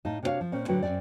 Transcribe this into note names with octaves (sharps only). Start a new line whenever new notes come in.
A2 D#4 F5 A5
C3 D4 E4 F#4 C#5 F5
F3
A#2 C4 C#4
A2 D3 F#3 F#4 B4 G5
F#2 F3 C4 D5